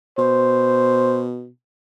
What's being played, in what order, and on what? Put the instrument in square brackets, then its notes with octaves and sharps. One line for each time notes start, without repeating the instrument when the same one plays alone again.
[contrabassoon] B2 [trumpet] C5